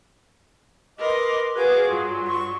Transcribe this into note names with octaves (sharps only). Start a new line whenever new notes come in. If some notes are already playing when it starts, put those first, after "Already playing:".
A#4 B4 D#5 C6 D6
F#4 G#4 B4 F5 G#5 D6
G2 F#3 F4
C6 C#6